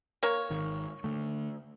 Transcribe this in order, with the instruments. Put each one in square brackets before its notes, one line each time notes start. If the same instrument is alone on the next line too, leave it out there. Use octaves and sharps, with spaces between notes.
[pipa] A#3 C#5
[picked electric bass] G#1 D#3
D3 A3